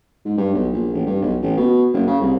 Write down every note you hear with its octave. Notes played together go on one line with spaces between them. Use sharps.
G#2
G2
B1
A#1
A1
G2
B1
A1
B2
F#1
C#3
C2